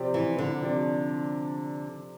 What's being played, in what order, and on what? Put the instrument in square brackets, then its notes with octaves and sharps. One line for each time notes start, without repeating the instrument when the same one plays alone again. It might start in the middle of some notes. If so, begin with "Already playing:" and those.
Already playing: [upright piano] C3 F3 C4 G4 D5
[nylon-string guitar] E3
D3
[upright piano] C3 F3 C4 G4 D5